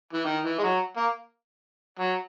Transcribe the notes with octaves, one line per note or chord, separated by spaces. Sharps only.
E3
D#3
E3
G#3
F#3
A#3
F#3